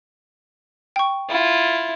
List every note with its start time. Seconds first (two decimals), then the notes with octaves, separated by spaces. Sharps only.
0.96 G5 C#6
1.29 E4 F4